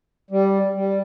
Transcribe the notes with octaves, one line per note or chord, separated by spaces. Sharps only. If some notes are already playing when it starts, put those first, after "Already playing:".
G3
G3